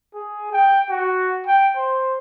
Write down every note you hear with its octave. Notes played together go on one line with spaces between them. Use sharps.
G#4
G5
F#4
G5
C5